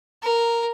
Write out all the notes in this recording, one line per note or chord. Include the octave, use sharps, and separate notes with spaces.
A#4